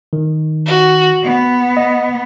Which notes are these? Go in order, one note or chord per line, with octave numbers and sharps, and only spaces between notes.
D#3
F#4
B3
D#5